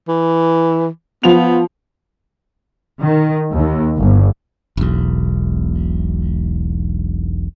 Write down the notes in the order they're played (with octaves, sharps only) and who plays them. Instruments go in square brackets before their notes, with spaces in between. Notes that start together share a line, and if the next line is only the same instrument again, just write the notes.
[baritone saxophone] E3
[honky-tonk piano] F3 F7 [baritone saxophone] B3
[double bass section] D#3
D#2
G1
[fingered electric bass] E1 B1